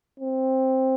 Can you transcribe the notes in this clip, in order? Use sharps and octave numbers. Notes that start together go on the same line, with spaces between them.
C4